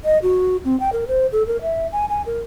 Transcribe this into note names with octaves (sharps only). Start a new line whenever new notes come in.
D#5
F#4
C4
G5
A#4
C5
A4
A#4
E5
G#5
G#5
A#4